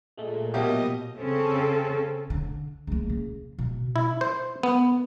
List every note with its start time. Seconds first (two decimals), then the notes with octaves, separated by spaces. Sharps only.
0.18 A#2 G#3 A3
0.54 B2 F3 F#3 A#3 E4 G4 D#5
1.19 C#3 C4 C#4 A4
2.30 D3
2.87 C#2 A#3
3.10 C#3
3.59 B2
3.96 E4
4.21 C5
4.63 B3